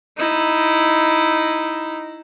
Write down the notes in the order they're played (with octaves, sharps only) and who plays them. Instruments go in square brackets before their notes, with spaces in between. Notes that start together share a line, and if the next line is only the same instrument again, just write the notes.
[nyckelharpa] D#4 E4